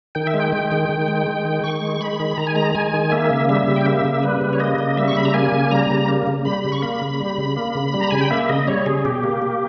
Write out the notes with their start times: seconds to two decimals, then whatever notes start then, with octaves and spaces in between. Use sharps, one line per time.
0.15 D#3 G5
0.27 E5
0.34 G#3
0.40 G5
0.52 G#3
0.72 D#3
0.89 D#3
1.08 G#3
1.27 G#3
1.45 D#3
1.64 D#3 C#6
1.82 G#3
2.01 G#3 B5
2.20 D#3
2.38 D#3 A#5
2.47 G#5
2.55 G#3 A#5
2.75 G#3 G#5
2.94 D#3
3.12 A#3 E5
3.31 C#3
3.49 G3 E5
3.68 C#3
3.76 G5
3.86 A#3 E5
4.05 C#3
4.23 G3 B4
4.41 C#3
4.53 C#5
4.60 A#3 D#5
4.78 C#3
4.97 G3 E5
5.08 C#6
5.16 C#3 B5
5.25 A#5
5.34 A#3 G#5
5.52 C#3
5.71 G3 A#5
5.90 C#3
6.08 A#3
6.27 C#3
6.45 G3 B5
6.64 C#3
6.72 C#6
6.82 A#3 B5
7.01 C#3
7.20 G3
7.38 C#3
7.57 A#3
7.75 C#3
7.94 G3
8.00 A#5
8.11 C#3 G#5
8.21 G5
8.31 A#3 E5
8.49 C#3 D#5
8.68 G3 C#5
8.86 C#3 G#4
9.05 B2 G4
9.24 A#3
9.42 A#3